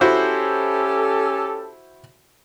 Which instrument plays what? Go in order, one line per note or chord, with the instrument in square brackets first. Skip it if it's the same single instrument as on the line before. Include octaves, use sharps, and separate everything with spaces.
[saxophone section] C#4 G4 A4 [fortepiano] E4 F#4 C5